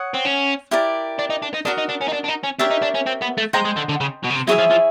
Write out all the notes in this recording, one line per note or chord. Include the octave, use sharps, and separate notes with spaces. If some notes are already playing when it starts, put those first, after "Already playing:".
Already playing: C#5 F#5 D#6
C4
C#4
E4 G4 A#4 D5
D4
D#4
D4
D#4
D4 F#4 A#4 D#5
D#4
D4
C#4
D#4
D4
D4
D#4
C#4
D4 G4 A#4 C#5 E5
D#4
D4
C#4
C4
B3
A3
G#3 C5 D#5 G5 A#5
G#3
D3
D3
C#3
B2
C#3
C3
F#3 E4 G#4 C#5 E5
F3
F3